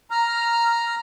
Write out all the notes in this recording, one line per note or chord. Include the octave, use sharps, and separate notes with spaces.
A#5 F6